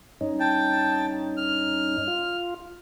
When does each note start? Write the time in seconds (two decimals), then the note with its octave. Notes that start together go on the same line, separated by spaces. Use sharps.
0.21 G2 C#4 D#4
0.40 G5 A5
1.37 F6
2.08 F4